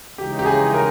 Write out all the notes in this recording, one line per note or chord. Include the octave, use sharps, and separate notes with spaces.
C#3 E3 G#3 D#4 G4
G4
G#4
A#4